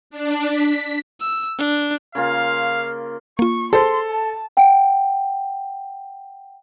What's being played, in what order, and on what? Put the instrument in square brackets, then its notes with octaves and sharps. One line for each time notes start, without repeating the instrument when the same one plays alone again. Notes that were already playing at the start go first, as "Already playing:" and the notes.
[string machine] D4
B6
[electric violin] E6
D4
[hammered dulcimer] C#3 A#3 F4 [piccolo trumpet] F5
[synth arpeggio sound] A#3 F4 [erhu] C#6
[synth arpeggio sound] G#4 C5 [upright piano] A4 [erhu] C6
[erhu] A5
[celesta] F#5 G5